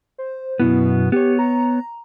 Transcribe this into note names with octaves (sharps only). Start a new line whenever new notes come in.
C5
F#2 B2 B3 E4
B3 G4 C#5
A#5